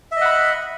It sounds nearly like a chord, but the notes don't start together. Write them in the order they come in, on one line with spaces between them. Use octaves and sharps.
E5 D#5 F#5 B5